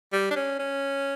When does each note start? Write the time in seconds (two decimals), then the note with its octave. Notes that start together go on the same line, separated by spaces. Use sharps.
0.13 G3
0.31 D4
0.36 C#4
0.59 C#4